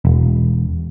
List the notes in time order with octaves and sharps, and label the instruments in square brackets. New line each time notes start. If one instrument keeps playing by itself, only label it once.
[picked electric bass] E1